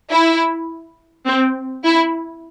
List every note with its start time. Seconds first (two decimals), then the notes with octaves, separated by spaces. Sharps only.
0.11 E4
1.26 C4
1.84 E4